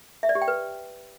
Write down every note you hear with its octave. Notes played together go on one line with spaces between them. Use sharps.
E5
D5
G4
G5
B4